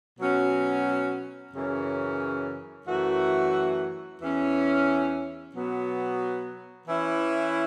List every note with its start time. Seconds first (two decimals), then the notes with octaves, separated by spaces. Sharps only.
0.19 B2 F#3 C#4 F#4
1.52 F#2 C#3 E3 C#4
2.86 F#2 E3 A3 F#4
4.20 E2 E3 C#4
5.53 B2 F#3 B3
6.86 E3 C#4 E4